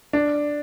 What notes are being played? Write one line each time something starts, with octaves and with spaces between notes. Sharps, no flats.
D4